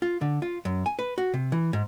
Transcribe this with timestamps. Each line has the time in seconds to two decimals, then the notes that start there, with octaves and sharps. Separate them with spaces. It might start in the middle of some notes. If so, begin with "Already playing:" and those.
0.02 F4
0.21 D3
0.42 F4
0.65 F#2
0.86 G#5
0.99 B4
1.18 F#4
1.34 C3
1.52 E3
1.73 G#2